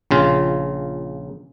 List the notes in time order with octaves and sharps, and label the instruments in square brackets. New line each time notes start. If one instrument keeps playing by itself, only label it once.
[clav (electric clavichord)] A#1 C#3 F4